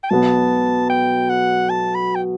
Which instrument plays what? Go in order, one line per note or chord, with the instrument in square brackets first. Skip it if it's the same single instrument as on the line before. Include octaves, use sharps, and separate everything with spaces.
[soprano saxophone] G5
[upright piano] B1 B2 F#3 B3 [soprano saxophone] A5
[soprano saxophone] G5
F#5
A5
B5
G5